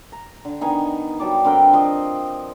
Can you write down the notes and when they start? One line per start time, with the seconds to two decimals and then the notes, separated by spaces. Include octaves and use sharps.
0.12 A#5
0.45 D3
0.61 D#3 B3 D#4 G#5
1.19 F#3 G3 A5 D6
1.44 D3 C4 A#4 G5
1.73 F3 C5 D#5